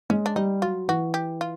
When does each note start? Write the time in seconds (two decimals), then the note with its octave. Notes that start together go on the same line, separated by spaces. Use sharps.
0.10 G#3 C#4
0.26 D4
0.36 G3 D#4
0.62 F#3 F4
0.88 E3 F#4
1.14 G4
1.41 F4